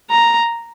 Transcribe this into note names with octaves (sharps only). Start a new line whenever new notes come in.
A#5